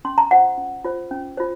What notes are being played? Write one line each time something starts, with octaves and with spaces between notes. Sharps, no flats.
C#4 C6
A#5
F4 C5 F#5
C#4
F4 C5
C#4
F4 C5